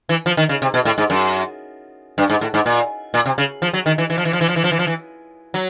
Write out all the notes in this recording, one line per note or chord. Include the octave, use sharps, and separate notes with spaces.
E3
F3
D#3
C#3
C3
B2
A2
G#2
F#2
G2
G#2
A2
G#2
A#2
A#2
C3
C#3
F3
F#3
D#3
E3
E3
F3
E3
F3
E3
F3
E3
F3
E3
F3
E3
F#3